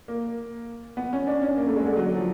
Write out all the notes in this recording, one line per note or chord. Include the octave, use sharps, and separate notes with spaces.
A#3
B3
C#4
D4
C#4
A#3
A3
G#3
D3
F#3
F3